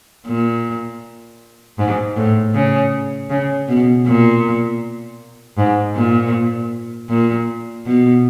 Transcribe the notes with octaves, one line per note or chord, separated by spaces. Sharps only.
A#2
G#2
A2
C#3
C#3
B2
A#2
G#2
A#2
A#2
B2